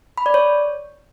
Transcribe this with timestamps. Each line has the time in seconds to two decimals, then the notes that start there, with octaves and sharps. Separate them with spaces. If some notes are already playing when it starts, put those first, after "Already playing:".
0.18 B5
0.26 D5
0.34 C#5